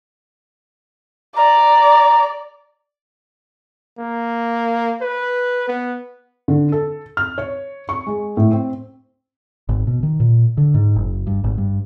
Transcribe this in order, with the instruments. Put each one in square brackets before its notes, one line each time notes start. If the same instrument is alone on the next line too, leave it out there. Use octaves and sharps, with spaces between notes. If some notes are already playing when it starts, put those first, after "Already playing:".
[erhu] D5 [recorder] A#5
[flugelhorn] A#3
B4
B3
[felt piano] D3
A4
F6
C#5
C#6
G#3
A2
C4
[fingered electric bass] G#1
B2
D#3
A#2
D3
G#2
F#1
G2
G#1
G2